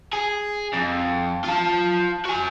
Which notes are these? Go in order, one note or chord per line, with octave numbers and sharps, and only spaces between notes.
G#4
F2
F4 A5
F#4 G#5